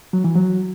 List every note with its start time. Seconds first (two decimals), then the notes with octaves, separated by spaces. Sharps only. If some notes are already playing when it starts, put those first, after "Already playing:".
0.13 F#3
0.24 E3
0.36 F#3